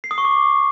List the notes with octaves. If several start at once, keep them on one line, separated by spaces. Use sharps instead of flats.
C7
D#6
C#6
D6